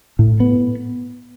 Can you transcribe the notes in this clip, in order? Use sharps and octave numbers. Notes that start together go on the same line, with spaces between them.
A2
B3